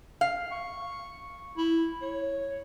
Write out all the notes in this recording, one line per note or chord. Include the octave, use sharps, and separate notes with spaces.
F5
C#6
E4
C#5